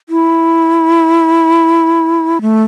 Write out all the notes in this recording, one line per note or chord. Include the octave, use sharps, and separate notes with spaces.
E4
A3